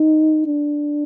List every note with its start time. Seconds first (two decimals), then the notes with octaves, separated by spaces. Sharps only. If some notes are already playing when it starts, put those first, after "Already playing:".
Already playing: D#4
0.46 D4